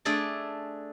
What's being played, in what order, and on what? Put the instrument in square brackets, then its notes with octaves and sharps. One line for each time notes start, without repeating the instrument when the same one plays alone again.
[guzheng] A3 D4 G#4 A4 D5